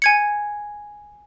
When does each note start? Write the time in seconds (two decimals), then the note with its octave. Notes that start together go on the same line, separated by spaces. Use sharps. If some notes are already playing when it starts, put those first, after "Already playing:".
0.02 G#5 G#6 C#7